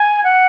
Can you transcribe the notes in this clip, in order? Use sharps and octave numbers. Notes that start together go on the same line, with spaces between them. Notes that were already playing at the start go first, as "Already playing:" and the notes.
Already playing: G#5
F#5